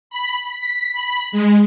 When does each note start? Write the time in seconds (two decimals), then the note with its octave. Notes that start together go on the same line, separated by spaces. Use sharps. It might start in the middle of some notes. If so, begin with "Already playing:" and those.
0.10 B5
0.49 B6
0.93 B5
1.32 G#3